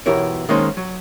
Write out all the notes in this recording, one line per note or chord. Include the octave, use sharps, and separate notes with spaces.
B1 E3 E4 G4 A#4 C#5
D#3 G#3 A#3 C#4 D#4 C5
F#3